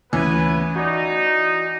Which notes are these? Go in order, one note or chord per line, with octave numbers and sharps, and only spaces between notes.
D2 E3 B3 C#4 B4 G#5
D#4 F#4 D5